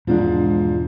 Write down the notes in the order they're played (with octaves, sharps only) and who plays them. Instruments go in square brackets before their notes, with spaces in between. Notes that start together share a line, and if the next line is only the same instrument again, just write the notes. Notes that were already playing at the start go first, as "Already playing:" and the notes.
[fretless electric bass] E1 D4 [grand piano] G#2 F3